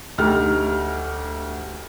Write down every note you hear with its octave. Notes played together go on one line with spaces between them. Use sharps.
D2 D#4 G4 F6